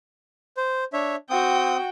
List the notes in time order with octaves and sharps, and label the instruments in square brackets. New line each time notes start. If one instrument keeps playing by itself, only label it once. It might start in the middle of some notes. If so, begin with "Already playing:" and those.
[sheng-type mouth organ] C5
D4 C#5 E5
[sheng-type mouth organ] C4 D#6 [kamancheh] F#4 G5